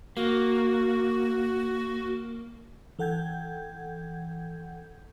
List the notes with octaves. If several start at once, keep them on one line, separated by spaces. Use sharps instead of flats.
A#3 F#4
E3 A4 F#5 G5 G6 G#6